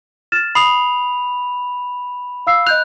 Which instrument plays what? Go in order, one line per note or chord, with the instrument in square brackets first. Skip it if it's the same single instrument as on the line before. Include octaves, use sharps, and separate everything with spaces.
[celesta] F6 A6 E7
[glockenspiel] B5 F7 [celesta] D#6 C7
[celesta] F5 E6 C7
[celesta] D#5 G6 F7 [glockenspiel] F#6